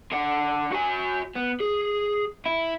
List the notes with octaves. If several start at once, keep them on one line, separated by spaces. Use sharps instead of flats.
D3 F#5
F#4 G#5
B3
G#4
E4